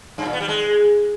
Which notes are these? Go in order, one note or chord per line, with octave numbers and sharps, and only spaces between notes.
G2
A#2
B3
G3
G#3